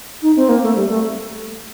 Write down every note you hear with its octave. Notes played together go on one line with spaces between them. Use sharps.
D#4
C4
A#3
A3
G3
A3